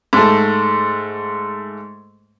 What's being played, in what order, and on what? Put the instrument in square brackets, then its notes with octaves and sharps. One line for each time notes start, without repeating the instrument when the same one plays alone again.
[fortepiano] G#2 A3